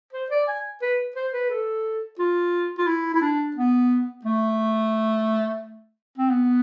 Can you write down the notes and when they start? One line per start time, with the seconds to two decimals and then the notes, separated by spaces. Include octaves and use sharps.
0.13 C5
0.30 D5
0.48 G#5
0.82 B4
1.16 C5
1.33 B4
1.50 A4
2.19 F4
2.78 F4
2.87 E4
3.14 E4
3.21 D4
3.56 B3
4.25 A3
6.18 C4
6.30 B3